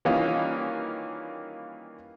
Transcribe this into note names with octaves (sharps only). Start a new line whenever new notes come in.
D#3 E3 G3 A#3 C#4 F4